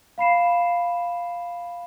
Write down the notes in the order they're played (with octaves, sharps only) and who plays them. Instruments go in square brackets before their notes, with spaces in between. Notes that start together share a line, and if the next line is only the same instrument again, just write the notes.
[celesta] F5 B5 C7 E7